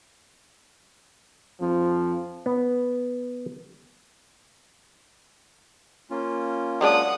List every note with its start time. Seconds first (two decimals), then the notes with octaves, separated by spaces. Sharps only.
1.61 F2 F3
2.46 B3
6.11 A#3 C#4 F4
6.81 F#3 G#3 D4 F#5 D#6